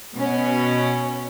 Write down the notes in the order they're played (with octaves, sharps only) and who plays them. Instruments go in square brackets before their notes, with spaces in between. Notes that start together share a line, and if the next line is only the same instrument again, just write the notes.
[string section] B2 C#4